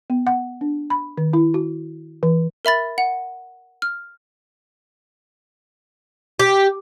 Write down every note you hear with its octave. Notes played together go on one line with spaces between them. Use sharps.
B3
F#5
D4
B5
D#3
E4
F#4
E3
A#4 E5 B5 A6
F#5
F6
G4